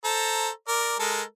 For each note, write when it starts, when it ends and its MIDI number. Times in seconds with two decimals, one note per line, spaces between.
0.04 0.49 69
0.04 0.49 72
0.04 0.49 82
0.68 0.97 70
0.68 0.97 74
0.99 1.22 56
0.99 1.22 69
0.99 1.22 70